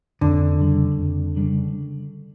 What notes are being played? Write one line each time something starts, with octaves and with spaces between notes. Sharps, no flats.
F2 D3
C#3 G3 D4
F2
C#3 G3 D4